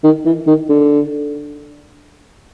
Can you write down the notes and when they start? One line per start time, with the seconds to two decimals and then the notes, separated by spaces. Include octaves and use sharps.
0.04 D#3
0.25 E3
0.47 D#3
0.69 D3